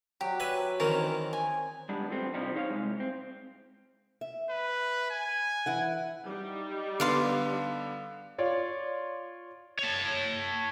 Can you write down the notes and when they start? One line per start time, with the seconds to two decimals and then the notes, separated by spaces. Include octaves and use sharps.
0.21 F#3 G4 D5
0.40 B4 E5 G#5
0.80 D#3 E3 C4 C#4 G#4 A#4
1.33 G#5
1.89 G3 G#3 B3 D4
2.10 F3 A3 B3 C4
2.34 G2 C3 F3 G3 D#4
2.55 D#4 G#4 C5 C#5 F5
2.70 C2 G#3
3.00 C4
4.21 E5
4.50 B4
5.10 G#5
5.66 E3 E4 F#5
6.26 G3 D#4
7.00 D3 B3 D5 F5 C6
8.38 F4 C#5 D5
9.79 C#5 A5